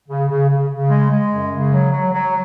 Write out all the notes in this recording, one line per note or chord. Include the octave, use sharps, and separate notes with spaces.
C#3
C#3
C#3
C#3
G#3
G#3
F#2
C#3
F#3
F#3
F#3